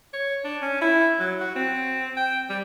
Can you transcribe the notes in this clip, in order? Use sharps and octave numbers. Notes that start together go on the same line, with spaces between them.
C#5
D4
C#4
E4
F#3
F#4
C4
G5
G3